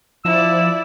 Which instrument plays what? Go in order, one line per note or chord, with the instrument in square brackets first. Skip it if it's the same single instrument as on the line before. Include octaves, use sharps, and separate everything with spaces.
[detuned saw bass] F3 [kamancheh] E4 D5 [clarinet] E6